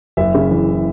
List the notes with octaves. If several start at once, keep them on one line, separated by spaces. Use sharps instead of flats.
F#1 E5
C#3
E3